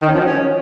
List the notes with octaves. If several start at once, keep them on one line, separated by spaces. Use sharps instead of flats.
D#3
C#4
F3
F#3
C#4